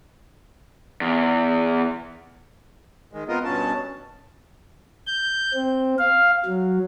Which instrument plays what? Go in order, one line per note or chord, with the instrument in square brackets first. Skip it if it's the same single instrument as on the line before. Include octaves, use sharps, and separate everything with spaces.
[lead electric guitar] E2
[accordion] D#3 G#3
B3 C4 F4 A#4 D#5
G2 B2 C#4 A5
[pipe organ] G6
C4
F5
F#3